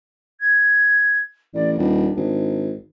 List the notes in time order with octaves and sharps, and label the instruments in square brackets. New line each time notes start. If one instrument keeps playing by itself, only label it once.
[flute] G#6
[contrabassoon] A1 [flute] D5
[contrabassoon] D#1 [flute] D4
[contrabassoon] G#1